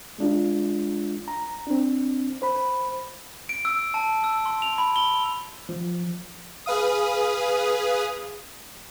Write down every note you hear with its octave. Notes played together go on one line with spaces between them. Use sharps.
G#3 D4 F4
A#5
C4 D4
C5 B5
D7
E6
A5
E6
C6
F7
B5
G7
F3
G#4 B4 F5 D#6